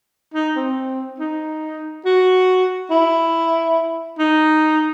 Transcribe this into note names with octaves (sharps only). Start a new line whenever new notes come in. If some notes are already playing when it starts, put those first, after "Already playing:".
D#4
C4
D#4
F#4
E4
D#4